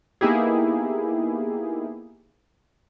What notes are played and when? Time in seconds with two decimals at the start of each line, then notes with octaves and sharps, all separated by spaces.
0.21 A#3 B3 D#4 E4 G4 G#4